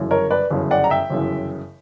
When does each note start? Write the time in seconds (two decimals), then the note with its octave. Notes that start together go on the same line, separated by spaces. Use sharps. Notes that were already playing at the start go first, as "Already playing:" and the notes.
Already playing: G1 F#2 C#3 E3
0.11 A#4 C#5
0.31 B4 D5
0.50 G1 F#2 C#3 E3
0.71 D5 F#5
0.84 A#5
0.90 E5 G5
1.10 G1 F#2 C#3 E3